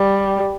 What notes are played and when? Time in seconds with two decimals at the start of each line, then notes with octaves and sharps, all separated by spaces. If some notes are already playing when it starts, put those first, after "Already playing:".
Already playing: G3